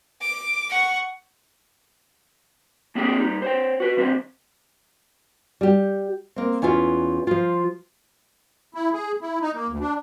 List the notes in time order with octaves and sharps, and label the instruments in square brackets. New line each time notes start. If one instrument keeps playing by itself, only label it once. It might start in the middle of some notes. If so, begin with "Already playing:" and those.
[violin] D6
F#5 C#6
[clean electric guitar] A#3 C4 D4 G4 G#4 G5
G3 D#4
C5 C#5 G5
F#4 B4
D#3 C4 D4 C5
[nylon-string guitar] G3 G4
A#3 C4
E2 C#4 E4 F4 E5
F3 F4
[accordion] E4
G#4
E4
D#4
A#3
D2
D4